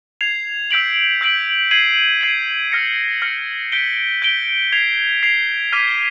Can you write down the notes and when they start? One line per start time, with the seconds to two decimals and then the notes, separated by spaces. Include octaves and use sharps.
0.21 G#6 C7 F7
0.71 E6 G6 B6 D7 F#7
1.21 E6 G6 B6 D7 F#7
1.71 G#6 C7 D#7 F#7
2.21 G#6 C7 D#7 F#7
2.72 F6 A#6 C#7
3.22 F6 A#6 C#7
3.72 G6 B6 D7 G7
4.22 G6 B6 D7 G7
4.72 G#6 C7 F7
5.23 G#6 C7 F7
5.73 D6 F6 G#6 B6 D#7